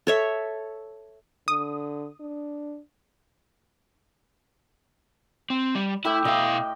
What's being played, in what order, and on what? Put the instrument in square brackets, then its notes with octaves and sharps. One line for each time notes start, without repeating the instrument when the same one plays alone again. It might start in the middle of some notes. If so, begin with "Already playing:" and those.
[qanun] A4 C#5 E5
[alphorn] D3 [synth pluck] D#6
[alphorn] D4
[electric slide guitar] C4
G3
[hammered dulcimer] A2 G4 E5 [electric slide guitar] E4
[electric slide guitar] B2 E4 F5 [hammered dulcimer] G4 D#5